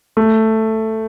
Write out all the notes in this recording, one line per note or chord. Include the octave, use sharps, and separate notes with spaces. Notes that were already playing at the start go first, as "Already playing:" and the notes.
A3